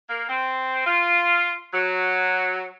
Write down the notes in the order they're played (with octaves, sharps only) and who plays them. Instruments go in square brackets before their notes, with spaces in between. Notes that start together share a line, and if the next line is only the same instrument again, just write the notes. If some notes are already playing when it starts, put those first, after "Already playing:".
[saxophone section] A#3
C4
F4
F#3